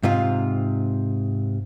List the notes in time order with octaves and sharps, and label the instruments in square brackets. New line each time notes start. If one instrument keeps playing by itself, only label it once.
[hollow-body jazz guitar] G#2 C3 F4